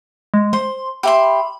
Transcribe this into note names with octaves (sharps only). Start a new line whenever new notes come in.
G#3
C5 C6
G4 E5 B5 C6